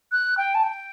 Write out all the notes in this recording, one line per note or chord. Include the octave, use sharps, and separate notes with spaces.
F#6
G5
A5
G5